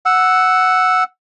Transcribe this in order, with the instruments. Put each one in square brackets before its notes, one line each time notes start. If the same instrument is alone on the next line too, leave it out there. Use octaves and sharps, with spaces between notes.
[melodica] F#5 E6